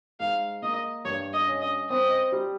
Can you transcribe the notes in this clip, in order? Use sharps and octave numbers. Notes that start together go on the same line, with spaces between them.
G#2 F5
A#3 D#5
G2 C#5
D#5
C#4
D#5
C4 D#5
G3